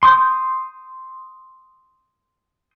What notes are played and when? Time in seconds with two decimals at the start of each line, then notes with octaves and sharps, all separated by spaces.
0.03 C6 D#6 G6